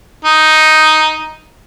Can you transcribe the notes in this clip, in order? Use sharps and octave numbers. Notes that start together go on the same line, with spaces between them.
D#4